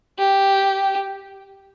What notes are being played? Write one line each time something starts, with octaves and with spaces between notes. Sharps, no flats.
G4